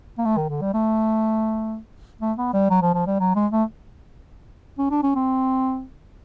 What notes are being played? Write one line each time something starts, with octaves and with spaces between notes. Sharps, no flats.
A#3
A3
D#3
D3
G3
A3
A3
B3
G3
F#3
F3
F3
G3
F#3
G#3
A3
C#4
D4
C#4
C4